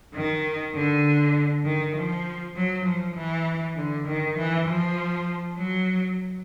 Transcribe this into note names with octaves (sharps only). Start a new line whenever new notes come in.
D#3
D3
D#3
F3
F#3
F3
E3
D3
D#3
E3
F3
F#3